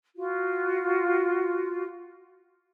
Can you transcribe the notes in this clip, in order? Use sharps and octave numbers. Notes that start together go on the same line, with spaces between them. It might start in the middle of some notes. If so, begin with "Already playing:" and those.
F4 F#4